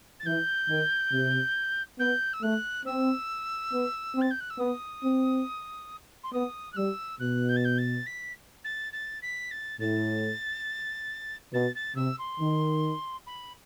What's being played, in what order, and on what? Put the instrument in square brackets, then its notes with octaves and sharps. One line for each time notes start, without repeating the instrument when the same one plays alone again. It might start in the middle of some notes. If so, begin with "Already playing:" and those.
[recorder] A6
[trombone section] E3 [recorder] G6
[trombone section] D#3
C3
[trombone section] B3 [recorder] G6
[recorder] E6
[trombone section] A3 [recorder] F#6
[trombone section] C4 [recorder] E6
[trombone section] B3
C4
[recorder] A6
G6
F#6
E6
[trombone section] B3 [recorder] D#6
[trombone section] C4
[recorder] C6
[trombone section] B3 [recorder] D#6
[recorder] F#6
[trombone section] G3 [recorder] E6
[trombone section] B2 [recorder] F#6
[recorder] G6
A6
G6
A6
B6
A6
A6
B6
A6
[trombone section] A2 [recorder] A6
[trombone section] B2 [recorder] A6
[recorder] A6
[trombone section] C3 [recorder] E6
[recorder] C6
[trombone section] D#3
[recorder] B5